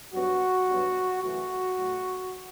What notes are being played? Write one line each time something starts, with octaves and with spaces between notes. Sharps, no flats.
G2 F#3 B3 F#4
G2 F#3 B3
F#2 C#3 E3 A3 F#4
A2 F#3 A3